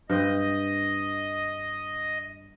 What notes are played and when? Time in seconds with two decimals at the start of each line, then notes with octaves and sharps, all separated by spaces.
0.10 G2 C4 D#5